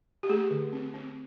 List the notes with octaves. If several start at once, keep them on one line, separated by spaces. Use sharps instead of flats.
G4
A3 G#4
D3
C4
C4